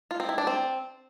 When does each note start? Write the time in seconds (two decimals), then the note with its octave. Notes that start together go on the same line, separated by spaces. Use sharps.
0.11 F4
0.20 C4
0.29 E4
0.38 D4
0.47 C4